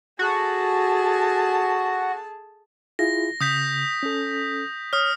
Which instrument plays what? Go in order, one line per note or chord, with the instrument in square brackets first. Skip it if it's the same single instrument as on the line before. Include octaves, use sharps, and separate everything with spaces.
[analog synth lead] F#4 [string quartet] G#4 A4 A5
[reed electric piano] E4 F4 G#4 [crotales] A#6
[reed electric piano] C#3 [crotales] D#6 G6 B6
[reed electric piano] C#4 A4
[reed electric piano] C#5 [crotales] D#6 F6